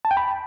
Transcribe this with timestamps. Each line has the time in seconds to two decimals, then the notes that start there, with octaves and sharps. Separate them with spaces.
0.05 A5
0.11 G5
0.17 B5